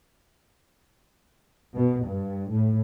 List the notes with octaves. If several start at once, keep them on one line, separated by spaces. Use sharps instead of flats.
B2
G2
A2